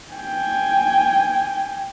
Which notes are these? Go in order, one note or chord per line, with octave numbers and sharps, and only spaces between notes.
G5 G#5